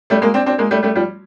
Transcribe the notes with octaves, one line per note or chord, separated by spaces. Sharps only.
G3 A3
G#3 A#3
C4 D4
C4 D4
G#3 A#3
G3 A3
G3 A3
F3 G3